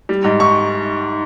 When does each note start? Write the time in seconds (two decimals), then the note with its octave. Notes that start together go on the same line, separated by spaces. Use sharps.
0.09 G3
0.24 G#2
0.40 C#6